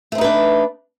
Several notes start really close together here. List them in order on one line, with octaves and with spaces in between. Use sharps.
A3 C4 D#4 B4 D4